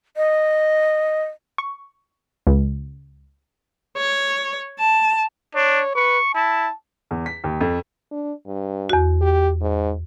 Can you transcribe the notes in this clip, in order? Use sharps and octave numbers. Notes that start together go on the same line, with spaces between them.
D#5
C#6
C#2
C#5
A5
D4 C#5
B4 C#6
E4 A5
E2
B6
D#2
F2
D4
G2
E2 F#4
G4
G#2